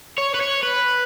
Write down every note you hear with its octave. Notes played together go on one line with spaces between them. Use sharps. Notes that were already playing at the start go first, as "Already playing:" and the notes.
C#5
B4
C#5
B4